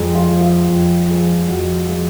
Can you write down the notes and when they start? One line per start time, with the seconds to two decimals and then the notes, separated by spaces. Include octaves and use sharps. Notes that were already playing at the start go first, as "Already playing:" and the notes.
Already playing: F2 G#3
0.15 F4
0.28 F3 G#3
0.41 F4
0.68 F2
1.08 F3 G#3
1.48 F2 F#4
1.88 F3 G#3 F4